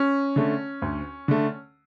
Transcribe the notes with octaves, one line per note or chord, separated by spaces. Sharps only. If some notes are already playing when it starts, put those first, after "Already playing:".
Already playing: C#4
D3 A3
D2
D3 A3